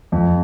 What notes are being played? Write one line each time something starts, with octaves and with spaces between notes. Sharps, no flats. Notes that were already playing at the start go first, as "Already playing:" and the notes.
F2